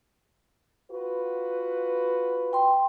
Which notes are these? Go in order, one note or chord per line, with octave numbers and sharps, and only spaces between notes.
F4 F#4 B4
G5 C6